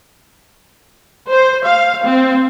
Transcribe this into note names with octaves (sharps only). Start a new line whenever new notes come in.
C5
F5
C4